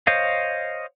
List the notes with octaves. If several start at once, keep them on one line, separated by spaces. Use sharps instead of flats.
C5 C#5 D#5 F5